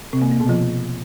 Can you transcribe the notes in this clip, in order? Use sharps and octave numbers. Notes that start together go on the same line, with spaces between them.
C3 C4
A#3
A#3
B2 B3
F3 F4